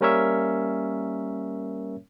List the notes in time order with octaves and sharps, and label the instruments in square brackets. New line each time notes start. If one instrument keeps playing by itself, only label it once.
[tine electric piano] G3 A#3 C#4 A#4 C#5 E5